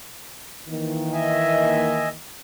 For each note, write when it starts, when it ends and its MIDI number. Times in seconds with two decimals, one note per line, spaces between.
0.68 2.17 51
0.68 2.17 52
0.68 2.17 58
1.13 2.08 75
1.13 2.08 76
1.13 2.08 80